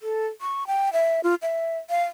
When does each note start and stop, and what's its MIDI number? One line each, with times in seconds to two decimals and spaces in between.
0.01 0.26 69
0.41 0.67 85
0.67 0.92 79
0.93 1.21 76
1.24 1.35 65
1.42 1.78 76
1.90 2.03 77